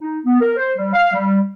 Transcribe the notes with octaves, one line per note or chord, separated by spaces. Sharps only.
D#4
B3
A#4
C5
G3
F5
G3